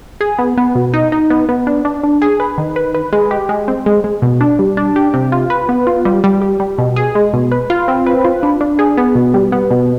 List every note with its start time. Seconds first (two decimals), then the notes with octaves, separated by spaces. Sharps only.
0.21 G#4
0.38 B3
0.57 B3
0.75 B2
0.94 D#4
1.12 D#4
1.30 B3
1.49 B3
1.67 D4
1.85 D4
2.03 D4
2.22 G#4
2.40 B4
2.58 D#3
2.76 B4
2.95 B4
3.13 G#3
3.31 G4
3.49 G#3
3.68 C4
3.86 G#3
4.04 G#3
4.22 B2
4.41 D4
4.59 G3
4.77 D4
4.96 G4
5.14 C3
5.32 F4
5.50 B4
5.69 B3
5.87 F4
6.05 G3
6.24 G3
6.42 G4
6.60 G3
6.78 B2
6.96 G#4
7.15 G#3
7.33 B2
7.52 B4
7.70 F4
7.88 C4
8.07 B4
8.25 F4
8.43 D4
8.61 D4
8.79 G#4
8.97 B3
9.15 B2
9.34 G3
9.52 B3
9.71 B2